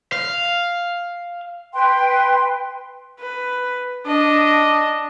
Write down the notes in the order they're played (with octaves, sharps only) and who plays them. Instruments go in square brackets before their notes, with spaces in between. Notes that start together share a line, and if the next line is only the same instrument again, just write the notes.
[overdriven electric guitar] F5
[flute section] B4 G5 C6
[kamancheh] B4
D4 D#5